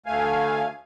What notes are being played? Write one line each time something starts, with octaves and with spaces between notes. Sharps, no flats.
D2 A3 F5 G#5